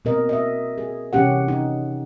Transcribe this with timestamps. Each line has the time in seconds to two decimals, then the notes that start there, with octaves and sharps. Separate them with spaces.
0.05 B2 C4 A#4 D#5
0.29 D#5 E5
0.78 G#4
1.13 C3 E3 C#4 G4 F#5
1.48 D#4